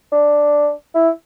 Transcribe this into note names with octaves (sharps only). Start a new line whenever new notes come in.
D4
E4